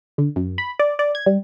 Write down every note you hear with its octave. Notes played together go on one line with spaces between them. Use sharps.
D3
F#2
B5
D5
D5
G#6
G3